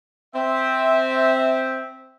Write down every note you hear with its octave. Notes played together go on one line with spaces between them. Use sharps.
C4 E5